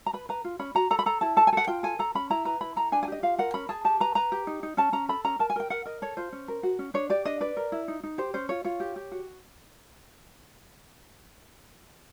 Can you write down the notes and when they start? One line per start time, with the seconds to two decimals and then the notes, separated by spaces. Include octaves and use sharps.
0.06 A#5
0.13 B4 B5
0.29 B4 A#5
0.45 F4
0.59 C#4 B5
0.75 F#4 A#5
0.90 A4 A#5
0.99 B5
1.06 A4 A#5
1.21 E4 A5
1.37 A4 A5
1.47 G#5
1.53 A4 F#5
1.67 F4 G5
1.83 A4 G#5
1.99 A4 A#5
2.15 C#4 B5
2.30 E4 A#5
2.45 B4 A#5
2.61 E4 B5
2.76 A4 A#5
2.92 D4 G#5
3.03 G#5
3.08 G4 D#5
3.23 F4 F5
3.38 A#4 F#5
3.54 C#4 B5
3.69 G#4 A5
3.85 G4 A5
4.00 B4 A#5
4.15 B4 A#5
4.32 G4
4.47 D#4
4.63 D#4
4.77 C#4 A5
4.92 C#4 A#5
5.09 A4 B5
5.24 C#4 A#5
5.39 A#4 A5
5.50 G#5
5.56 A#4 G5
5.70 A#4 F#5
5.85 A#4 D#5
6.02 A4 C#5
6.17 F4 C5
6.32 C#4
6.48 A#4
6.63 F#4
6.79 C#4
6.94 D4 C#5
7.10 G4 D5
7.25 D4 D#5
7.41 B4 D5
7.57 A#4
7.72 E4
7.88 D#4
8.03 D#4
8.18 G4 C5
8.34 C#4 C5
8.49 F4 C#5
8.64 F4 C#5
8.80 G4
8.96 G4
9.12 F#4